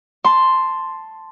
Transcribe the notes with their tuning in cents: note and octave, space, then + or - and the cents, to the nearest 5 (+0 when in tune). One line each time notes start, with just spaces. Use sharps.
A5 +0 C6 +0